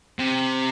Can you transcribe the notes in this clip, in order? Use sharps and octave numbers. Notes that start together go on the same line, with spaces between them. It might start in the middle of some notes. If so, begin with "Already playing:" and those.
C3